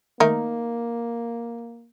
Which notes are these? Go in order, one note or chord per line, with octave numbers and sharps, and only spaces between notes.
D#3 A3 A#3 D#4 A#4